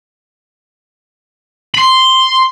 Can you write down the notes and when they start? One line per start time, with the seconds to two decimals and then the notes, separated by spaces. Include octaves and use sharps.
1.75 B5 C6